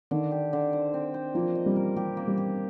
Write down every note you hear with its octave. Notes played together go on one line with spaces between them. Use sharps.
D3 D#3
G4
D3
C5
C4
C5
F3 A#3
D#5
G3
A#4
G3 G4
A#3
G3
G4